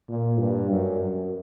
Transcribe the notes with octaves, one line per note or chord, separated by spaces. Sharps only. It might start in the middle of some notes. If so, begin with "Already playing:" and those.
A#2
G2
F#2
F#2